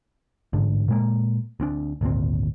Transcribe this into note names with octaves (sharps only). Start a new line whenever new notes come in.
A1 G#2 D3
A#2 G#3 A#3
D2 C4 D4
G#1 D2 A#2 C4